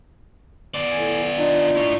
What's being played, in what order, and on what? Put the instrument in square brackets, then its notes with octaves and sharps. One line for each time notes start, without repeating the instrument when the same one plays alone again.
[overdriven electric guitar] B3 D5
[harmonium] A2 G#5
D4 D#4 F4
[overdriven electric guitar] E4 C#5